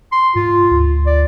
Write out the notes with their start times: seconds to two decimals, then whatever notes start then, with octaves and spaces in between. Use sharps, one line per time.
0.12 C6
0.35 G#2 F4
0.71 D2
1.06 D5